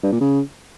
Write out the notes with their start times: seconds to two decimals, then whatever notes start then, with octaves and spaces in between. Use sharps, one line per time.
0.03 G2
0.12 A#2
0.21 C#3